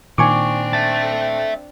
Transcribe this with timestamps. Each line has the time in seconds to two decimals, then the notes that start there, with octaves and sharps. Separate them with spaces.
0.18 A#2 D#3 C4 D4 G#5 C#6 D6
0.73 E5 A5 A6